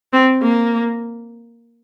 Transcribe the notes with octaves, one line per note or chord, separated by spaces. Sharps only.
C4
A#3